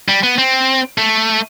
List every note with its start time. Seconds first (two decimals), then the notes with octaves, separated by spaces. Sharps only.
0.08 G3
0.23 B3
0.38 C4
0.98 A3